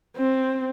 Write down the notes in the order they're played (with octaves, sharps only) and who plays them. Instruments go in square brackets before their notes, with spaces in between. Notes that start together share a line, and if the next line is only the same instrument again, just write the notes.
[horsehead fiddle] C4